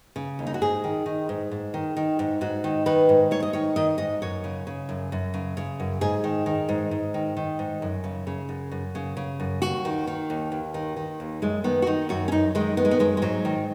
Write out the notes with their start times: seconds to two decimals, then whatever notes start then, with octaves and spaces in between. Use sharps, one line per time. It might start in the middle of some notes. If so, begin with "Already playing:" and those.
0.16 C#3
0.39 D#2
0.47 D#4
0.54 F#4
0.62 G#2 G#4
0.84 D#3
1.06 D#3
1.29 G#2
1.51 G#2
1.74 D#3
1.97 D#3
2.19 G#2
2.41 G#2 F#4
2.64 D#3
2.86 D#3 B4
3.09 G#2
3.31 G#2 C#5
3.43 D#5
3.53 D#3 C#5
3.76 D#3 D#5
3.98 G#2 D#5
4.22 F#2 C#5
4.44 C#3
4.67 C#3
4.89 F#2
5.12 F#2
5.34 C#3
5.57 C#3
5.80 F#2
6.01 G#2 G#4
6.24 D#3
6.46 D#3
6.69 G#2
6.91 G#2
7.14 D#3
7.37 D#3
7.59 G#2
7.82 F#2
8.04 C#3
8.27 C#3
8.49 F#2
8.71 F#2
8.95 C#3
9.17 C#3
9.40 F#2
9.62 D#2 F#4
9.85 D#3
10.07 D#3
10.30 D#2
10.52 D#2
10.74 D#3
10.96 D#3
11.20 D#2
11.42 F#2 G#3
11.64 D#3 B3
11.82 F#4
11.87 D#3 D#4
12.09 F#2 F#4
12.28 C#4
12.32 F#2 D#4
12.55 D#3 G#3
12.77 D#3 B3
12.85 G#3
12.91 B3
12.99 F#2 G#3
13.17 G#3
13.22 G#2 F#3
13.45 D#3